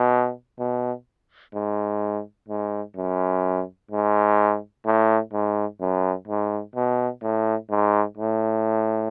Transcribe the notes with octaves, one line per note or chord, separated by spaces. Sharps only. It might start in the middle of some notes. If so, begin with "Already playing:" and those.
Already playing: B2
B2
G#2
G#2
F#2
G#2
A2
G#2
F#2
G#2
B2
A2
G#2
A2